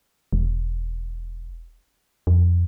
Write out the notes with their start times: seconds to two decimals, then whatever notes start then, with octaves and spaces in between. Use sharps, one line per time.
0.33 E1
2.27 F2